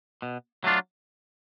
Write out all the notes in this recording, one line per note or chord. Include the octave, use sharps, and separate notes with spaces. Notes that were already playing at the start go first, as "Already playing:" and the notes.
B2
F#3 A3 D4 F4